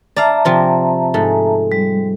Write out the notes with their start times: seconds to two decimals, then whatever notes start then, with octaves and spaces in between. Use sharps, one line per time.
0.17 D5 E5 F5 A5 A#5
0.45 C3 F3 C4
1.14 G#2 A3
1.72 G3